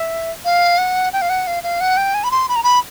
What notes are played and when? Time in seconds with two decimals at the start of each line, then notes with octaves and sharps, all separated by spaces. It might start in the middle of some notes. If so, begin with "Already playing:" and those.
Already playing: E5
0.45 F5
0.78 F#5
1.13 G5
1.22 F5
1.30 F#5
1.47 F5
1.63 F5
1.81 F#5
1.97 G5
2.14 G#5
2.24 B5
2.31 C6
2.49 B5
2.56 A#5
2.64 B5